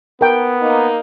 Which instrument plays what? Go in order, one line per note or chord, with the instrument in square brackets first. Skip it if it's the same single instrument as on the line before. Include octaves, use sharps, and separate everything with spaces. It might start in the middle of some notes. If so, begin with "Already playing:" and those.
[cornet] B3 [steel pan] A#4 G5
[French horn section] A#3 D#4